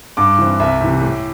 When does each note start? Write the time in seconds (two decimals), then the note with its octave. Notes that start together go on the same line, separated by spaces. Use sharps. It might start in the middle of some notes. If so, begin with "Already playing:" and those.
0.17 G2 D6
0.39 E3 C4
0.60 C2 E5
0.81 C3 E3
1.02 A2